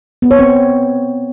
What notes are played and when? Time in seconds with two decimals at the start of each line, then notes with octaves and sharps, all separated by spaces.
0.22 B3
0.31 C#5
0.39 C4